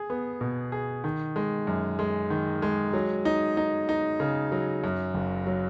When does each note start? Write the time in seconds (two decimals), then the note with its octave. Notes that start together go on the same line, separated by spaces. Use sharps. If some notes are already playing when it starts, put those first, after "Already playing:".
Already playing: G#4
0.10 B3
0.41 B2
0.72 G#4
1.04 D#3
1.36 G#3
1.67 F#2
1.99 G#3
2.30 D#3
2.62 G#3
2.93 F#3
3.25 D#4
3.57 D#4
3.89 D#4
4.20 C#3
4.52 F#3
4.84 F#2
5.14 F#1
5.47 F#3